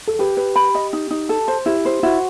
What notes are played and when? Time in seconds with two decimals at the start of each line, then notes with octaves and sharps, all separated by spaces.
0.07 A4
0.19 G4 B4
0.37 B4
0.56 B5
0.75 D#5
0.93 D#4
1.11 D#4
1.29 A4
1.48 C5
1.66 E4 G4
1.85 C5
2.03 E4 F#4